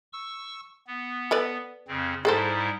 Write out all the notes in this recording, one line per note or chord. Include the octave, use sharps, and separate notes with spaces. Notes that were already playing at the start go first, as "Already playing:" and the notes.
C#6 E6
B3
A4 B4 D5
F2 C#3 C4
G#2 G3 E4 G#4 A4 C5